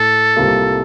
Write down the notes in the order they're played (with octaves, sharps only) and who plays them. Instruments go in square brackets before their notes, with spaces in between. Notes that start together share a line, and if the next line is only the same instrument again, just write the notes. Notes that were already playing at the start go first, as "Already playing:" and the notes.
Already playing: [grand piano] A2 A3 [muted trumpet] A4
[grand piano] C2 C3 G3 A#3 F4